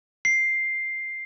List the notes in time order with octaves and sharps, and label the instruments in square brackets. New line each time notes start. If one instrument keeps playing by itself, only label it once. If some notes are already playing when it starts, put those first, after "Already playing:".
[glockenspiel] C7